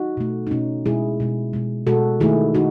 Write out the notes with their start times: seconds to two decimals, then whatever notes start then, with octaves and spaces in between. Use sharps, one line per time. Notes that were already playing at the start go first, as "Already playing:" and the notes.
Already playing: D#4 F#4
0.17 B2 A3
0.47 D#4
0.51 B2 A3 C#4
0.86 B2 G#3 E4 G#4
1.20 B2 G#3
1.53 B2 G#3
1.87 B2 G#3 F#4 A4
2.20 D#3 A3 E4 G#4
2.55 D#3 D#4 F#4